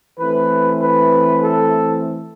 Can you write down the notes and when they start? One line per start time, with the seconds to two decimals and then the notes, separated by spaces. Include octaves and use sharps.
0.18 E3 A3 C4 B4
0.81 B4
1.43 A4